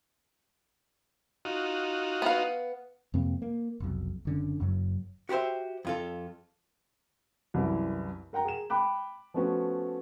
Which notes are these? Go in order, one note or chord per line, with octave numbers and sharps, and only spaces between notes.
D#4 F4 F#4
B3 F5
F2 C3 A#3 C4
A#3
F1 B1
F#1 D3 C#4
F#1 F#2 F#3
F#4 G4 A#4 C5 E5
F2 F4 A4
C2 F#2 E3
A#4 F#5 G5 A#5
G#4 E7
G5 B5 D6 F#6
F3 A3 B3 C#4 F#4